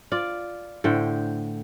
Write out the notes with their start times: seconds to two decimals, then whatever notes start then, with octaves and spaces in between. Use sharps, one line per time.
0.12 F4 D5
0.84 A2 D3 C5 G5